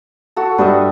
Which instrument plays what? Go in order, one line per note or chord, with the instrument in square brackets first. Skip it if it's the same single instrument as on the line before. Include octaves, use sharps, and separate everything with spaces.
[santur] F#4 A4
[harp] G2 [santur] B4 D#5 E5